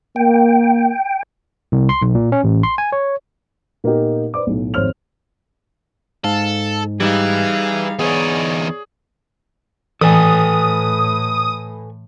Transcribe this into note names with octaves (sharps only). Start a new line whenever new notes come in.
A#3 G5
C2
C6
B1
A#2
C#4
A1
C6
G#5
C#5
A#2 A#3 B3 D#4 G4
B4 C5 D5 D6
B1 A2
G#1 F2 C5 C#5 F6 F7
G#2 A4 F5
E3 G3 D#4 G#4 F5
E2 B3 D#4 G#4 C#5 D5
A2 E3 A4 B4 G#5 D#6